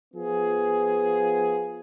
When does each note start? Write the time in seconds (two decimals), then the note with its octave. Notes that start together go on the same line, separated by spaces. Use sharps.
0.13 F3 B3 F4 G#4